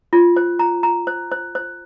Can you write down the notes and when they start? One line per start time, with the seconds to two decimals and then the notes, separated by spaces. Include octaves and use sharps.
0.13 F4
0.36 C5
0.59 A#5
0.83 A#5
1.07 C5
1.32 C5
1.55 C5